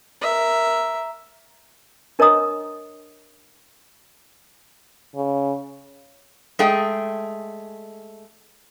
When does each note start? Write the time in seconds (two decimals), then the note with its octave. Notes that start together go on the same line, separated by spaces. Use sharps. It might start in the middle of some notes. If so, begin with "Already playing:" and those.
0.21 A#4 E5
2.19 D4 A#4 C#5 D#5 A#5 D#6
5.15 C#3
6.59 G#3 A3 G#4 G5